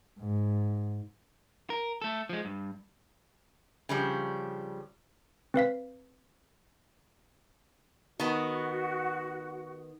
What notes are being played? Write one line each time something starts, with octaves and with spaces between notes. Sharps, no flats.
G#2
A#4
A3 A4
F3 G#3
G2
C#3 F3 G3 D4
C4 B4 F5 B6
D#3 B3 F#4